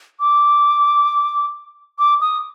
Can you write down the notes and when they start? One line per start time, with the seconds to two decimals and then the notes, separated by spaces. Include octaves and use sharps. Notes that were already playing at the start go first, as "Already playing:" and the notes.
0.20 D6
1.99 D6
2.21 D#6